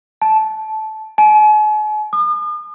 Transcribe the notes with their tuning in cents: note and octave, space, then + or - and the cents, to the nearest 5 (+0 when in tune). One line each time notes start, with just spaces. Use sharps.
A5 -15
G#5 +45
D#6 -45